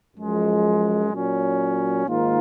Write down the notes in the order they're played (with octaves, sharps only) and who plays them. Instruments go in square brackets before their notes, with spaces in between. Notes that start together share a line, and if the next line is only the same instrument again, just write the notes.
[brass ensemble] F#2 F3 G#3
A#2 F#3 C#4
G#2 D#3 A#3 F4 A#4